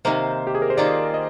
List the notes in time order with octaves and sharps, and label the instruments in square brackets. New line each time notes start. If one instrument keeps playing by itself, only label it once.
[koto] C3 D#3 A#3 [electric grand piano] C5
[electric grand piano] G4
G#4
A#4
C5
[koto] D#3 A#3 F4 [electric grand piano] D5
[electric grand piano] D#5